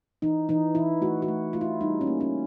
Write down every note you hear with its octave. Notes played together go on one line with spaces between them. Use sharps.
E3 D#4
E3 D#4
E3 E4
A3 F#4
F#4
A3
A3 F4
E4
G3 D#4
C#4
A#3
C#4